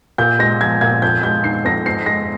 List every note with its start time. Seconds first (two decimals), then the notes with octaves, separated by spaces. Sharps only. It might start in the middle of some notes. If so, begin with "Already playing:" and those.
0.18 A#2 G6
0.39 G#3 A#6
0.60 F3 G#6
0.81 A#2 G#6
1.02 F2 G6
1.23 G#3 G6
1.44 D#3 C7
1.65 F2 A#6
1.86 G#2 C7
2.06 G#3 A#6